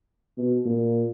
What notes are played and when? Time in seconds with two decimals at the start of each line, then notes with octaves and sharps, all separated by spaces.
0.38 B2
0.65 A#2